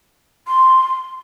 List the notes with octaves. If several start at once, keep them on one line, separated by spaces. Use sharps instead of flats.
C6